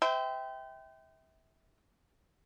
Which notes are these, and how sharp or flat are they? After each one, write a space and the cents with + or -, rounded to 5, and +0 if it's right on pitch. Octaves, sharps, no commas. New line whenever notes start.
C5 -35 E5 -25 G5 +0